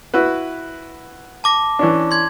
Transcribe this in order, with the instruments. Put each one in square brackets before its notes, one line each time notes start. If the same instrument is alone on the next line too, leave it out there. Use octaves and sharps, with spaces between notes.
[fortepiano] E4 F#4 B4
[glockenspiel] A5 D6 A#6
[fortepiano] E3 C#4 D4
[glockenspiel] C6 G#6